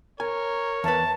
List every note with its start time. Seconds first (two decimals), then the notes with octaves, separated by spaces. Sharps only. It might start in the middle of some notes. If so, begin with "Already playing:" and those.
0.20 A#4 C#5 G#5
0.84 E2 B4 A5